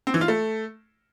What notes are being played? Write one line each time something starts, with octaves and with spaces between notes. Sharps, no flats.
C4
E3
F4
A3